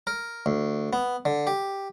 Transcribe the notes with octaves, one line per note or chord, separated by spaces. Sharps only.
A#4
D2
B3
D3
G4